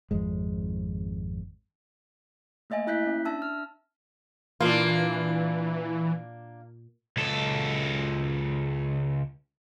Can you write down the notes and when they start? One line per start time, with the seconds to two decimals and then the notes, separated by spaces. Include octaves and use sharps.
0.11 G#1 F2 G#3
2.70 A3 A#3 D#5 E5 G#5
2.86 A#3 E4 E5 F#6 G6 B6
3.06 C#4
3.25 D4 E5 A5 E6
3.42 F6
4.60 A#2 E3 A#3 D4 F4
7.17 C#2 A4